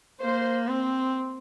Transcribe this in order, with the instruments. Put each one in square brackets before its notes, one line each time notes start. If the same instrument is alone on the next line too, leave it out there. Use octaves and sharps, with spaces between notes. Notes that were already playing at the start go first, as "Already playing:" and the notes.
[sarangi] A#3 [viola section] C5
[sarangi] C4